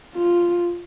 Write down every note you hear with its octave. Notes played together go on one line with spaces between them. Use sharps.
F4